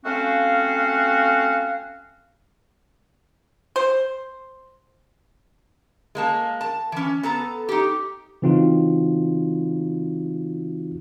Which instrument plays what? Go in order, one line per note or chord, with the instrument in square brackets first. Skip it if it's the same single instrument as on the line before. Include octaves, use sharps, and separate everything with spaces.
[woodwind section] A3 C4 C#4 F#4 F5
[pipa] C5
[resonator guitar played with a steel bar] G#3 A#3 A5
A5
E3 C#4
B3 A4 A#5
D#4 G4
[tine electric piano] C#3 E3 C4 D#4 F4 F#4